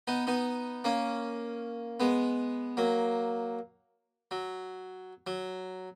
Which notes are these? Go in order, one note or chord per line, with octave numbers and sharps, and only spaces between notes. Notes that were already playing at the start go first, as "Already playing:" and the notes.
B3 D#4
B3 D#4
A#3 C#4
G#3 B3
F#3 A#3
F#3
F#3